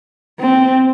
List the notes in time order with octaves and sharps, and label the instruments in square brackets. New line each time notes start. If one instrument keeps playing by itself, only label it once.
[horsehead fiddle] C4